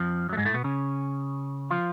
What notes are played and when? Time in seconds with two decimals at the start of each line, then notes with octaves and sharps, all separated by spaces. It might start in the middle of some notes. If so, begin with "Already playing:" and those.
Already playing: F2 F3
0.29 F#2 F#3 A3
0.37 G#2 G#3
0.45 A2 A3
0.54 B2 B3
0.64 C#3 C#4
1.71 F3 F4